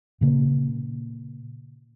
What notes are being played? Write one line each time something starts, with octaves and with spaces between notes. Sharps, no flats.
A#2 C#3 A#3